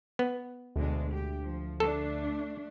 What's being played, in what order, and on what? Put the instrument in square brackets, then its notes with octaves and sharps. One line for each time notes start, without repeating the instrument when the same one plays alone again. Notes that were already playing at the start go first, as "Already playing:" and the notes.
[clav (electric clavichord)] B3
[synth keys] D2 [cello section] B2 G#3 D4
[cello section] G4
F3
[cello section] A3 D4 [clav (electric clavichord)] A4